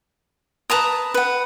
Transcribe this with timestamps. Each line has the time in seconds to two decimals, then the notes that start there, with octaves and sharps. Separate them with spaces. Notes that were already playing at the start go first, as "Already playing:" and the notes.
0.70 B4 A5 A#5 D#6
1.14 B4 F#5